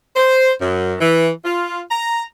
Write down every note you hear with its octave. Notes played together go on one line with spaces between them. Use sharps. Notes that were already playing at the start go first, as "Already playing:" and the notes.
C5
F#2
E3
F4
A#5